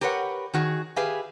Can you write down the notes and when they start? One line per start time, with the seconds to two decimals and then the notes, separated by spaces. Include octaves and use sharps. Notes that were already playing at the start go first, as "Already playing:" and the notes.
0.01 G4 A#4 B4 C#5 F#5
0.54 D#3 F#4 G#4
0.96 G4 G#4 B4 E5 F5